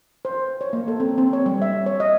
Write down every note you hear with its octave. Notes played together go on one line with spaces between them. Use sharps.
C5
C#5
A#3
A4
C4
C4
C#5
G3
E5
C#5
D#5